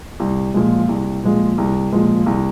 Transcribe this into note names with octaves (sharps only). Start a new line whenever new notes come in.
C2
A#2 F3 G#3
C2
A#2 F3 G#3
C2
A#2 F3 G#3
C2